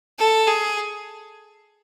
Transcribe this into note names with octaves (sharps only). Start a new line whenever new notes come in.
A4
G#4